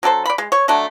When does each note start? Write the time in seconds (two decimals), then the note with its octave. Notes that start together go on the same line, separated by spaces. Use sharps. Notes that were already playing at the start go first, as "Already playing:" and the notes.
0.03 F#3 D4 A4 C5
0.26 D5 B5
0.38 G#3
0.52 C#5
0.68 D3 F#3 A3 D4